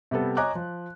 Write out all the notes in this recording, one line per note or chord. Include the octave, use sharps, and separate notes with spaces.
C3 G3 B3 A4
C#5 D#5 G#5 A#5 D6 F#6
F3